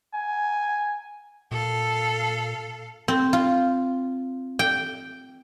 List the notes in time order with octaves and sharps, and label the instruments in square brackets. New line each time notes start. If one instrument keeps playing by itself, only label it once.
[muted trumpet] G#5
[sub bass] A#2 [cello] A4 F5
[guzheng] C4
F4
G5